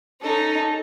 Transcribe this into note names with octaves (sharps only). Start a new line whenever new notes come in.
C#4 D#4 A4